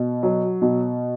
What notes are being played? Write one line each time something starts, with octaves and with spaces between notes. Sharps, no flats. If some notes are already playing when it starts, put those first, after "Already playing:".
Already playing: B2
F#3
B2